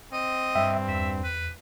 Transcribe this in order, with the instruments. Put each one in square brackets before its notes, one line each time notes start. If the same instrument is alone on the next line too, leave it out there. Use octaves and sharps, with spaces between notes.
[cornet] C4 [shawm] D#5
[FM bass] G2 [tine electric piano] E5 G5
[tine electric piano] E2 [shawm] E5
[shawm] B4